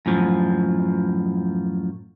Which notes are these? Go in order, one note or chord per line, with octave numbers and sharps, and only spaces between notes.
F#2 A2 F3